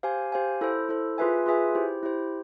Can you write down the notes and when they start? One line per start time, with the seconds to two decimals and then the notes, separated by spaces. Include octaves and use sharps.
0.03 G4 C5 F5 G#5
0.32 G4 C5 F5 G#5
0.61 E4 A4 C5
0.89 E4 A4 C5
1.18 F4 G#4 B4 E5 G#5
1.46 F4 G#4 B4 E5 G#5
1.75 E4 G4 C5
2.03 E4 G4 C5